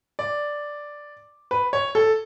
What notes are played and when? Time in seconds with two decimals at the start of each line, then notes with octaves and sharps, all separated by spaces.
0.19 D5
1.51 B4
1.73 C#5
1.95 A4